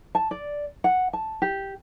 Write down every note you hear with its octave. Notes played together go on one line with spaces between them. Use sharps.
A5
D5
F#5
A5
G4